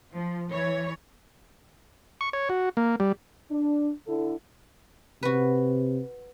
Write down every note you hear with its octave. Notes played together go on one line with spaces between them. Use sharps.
F3
E3 C#5
C#6
C#5
F#4
A#3
G3
D4
D3 E4 A4
C3 F#4 B4